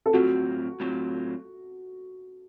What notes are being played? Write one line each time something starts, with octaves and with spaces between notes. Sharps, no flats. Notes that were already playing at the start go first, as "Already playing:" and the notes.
A4
A2 F#3 C4 F4 F#4
A2 F#3 C4 F4